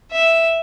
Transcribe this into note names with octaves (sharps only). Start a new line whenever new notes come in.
E5